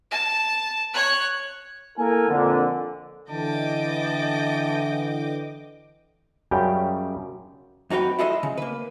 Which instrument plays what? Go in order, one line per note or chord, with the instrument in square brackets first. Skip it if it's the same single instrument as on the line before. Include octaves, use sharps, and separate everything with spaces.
[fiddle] A5
C#5 F#6
[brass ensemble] A#3 E4 A4 A#4 G#5
F2 A#2 D3
[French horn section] D3 E3 [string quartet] D#5 G5 D6 [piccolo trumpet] A5
[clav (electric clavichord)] F#2 C#3 G3 G4 G5
[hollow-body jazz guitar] F2 D#4 F#4 B4 G5
E4 F4 G#4 A4 D#5
C#3
A#3 B4